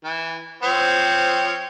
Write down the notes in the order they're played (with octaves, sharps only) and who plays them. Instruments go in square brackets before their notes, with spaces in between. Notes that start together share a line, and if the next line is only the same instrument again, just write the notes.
[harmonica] E3
F3 C4 C#5